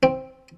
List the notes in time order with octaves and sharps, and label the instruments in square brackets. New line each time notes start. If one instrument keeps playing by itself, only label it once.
[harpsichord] C4